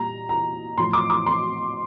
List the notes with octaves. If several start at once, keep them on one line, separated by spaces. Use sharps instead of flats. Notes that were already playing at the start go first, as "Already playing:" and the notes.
Already playing: A#2 G3 A#5
A#5
A2 F3 C6
D6
D6
C6